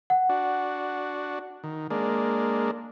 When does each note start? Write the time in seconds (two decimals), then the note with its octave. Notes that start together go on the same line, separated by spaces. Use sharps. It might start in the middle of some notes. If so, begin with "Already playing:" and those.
0.10 F#5
0.29 D4 F#4
1.64 D#3
1.91 G#3 A#3 D4